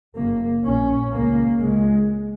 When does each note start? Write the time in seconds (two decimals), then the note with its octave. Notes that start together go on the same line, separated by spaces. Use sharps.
0.16 F#1 F#2 C#3 A#3
0.64 A#1 A#2 C#4
1.13 C#2 C#3 A#3
1.61 C#2 C#3 G#3